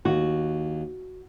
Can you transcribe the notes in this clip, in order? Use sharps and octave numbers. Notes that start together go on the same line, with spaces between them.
D#2 F#4